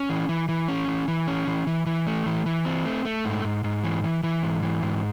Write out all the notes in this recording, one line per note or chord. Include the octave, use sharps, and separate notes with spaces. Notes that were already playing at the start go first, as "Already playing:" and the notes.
Already playing: C#4
E3
E3
E3
C#4
E3
E3
C#4
E3
E3
E3
A3
E3
E3
C4
A3
A3
G#2
G#2
G#2
E3
E3
E3
G#2
E3
G#2